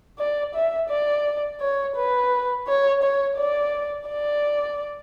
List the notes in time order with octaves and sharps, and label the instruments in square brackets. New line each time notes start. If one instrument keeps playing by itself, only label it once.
[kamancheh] D5
E5
D5
C#5
B4
C#5
C#5
D5
D5